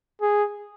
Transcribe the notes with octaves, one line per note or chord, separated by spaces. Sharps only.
G#4